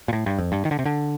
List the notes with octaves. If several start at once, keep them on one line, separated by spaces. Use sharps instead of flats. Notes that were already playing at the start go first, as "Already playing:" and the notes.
A#2
A2
G2
F2
G2
D#3
D3
C3
D3